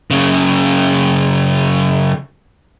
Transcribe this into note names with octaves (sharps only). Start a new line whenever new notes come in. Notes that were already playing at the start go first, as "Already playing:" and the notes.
F#2 C#3